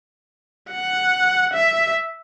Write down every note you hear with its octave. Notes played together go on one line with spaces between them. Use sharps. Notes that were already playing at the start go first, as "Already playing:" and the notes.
F#5
E5